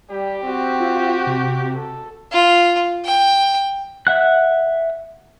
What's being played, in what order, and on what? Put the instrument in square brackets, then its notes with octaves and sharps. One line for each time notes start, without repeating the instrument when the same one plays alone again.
[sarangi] G3 [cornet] G4
[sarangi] C4 [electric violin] F#4
[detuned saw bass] F4
C3
[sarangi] A4
[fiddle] F4
G5
[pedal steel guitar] E5 F#5 F#6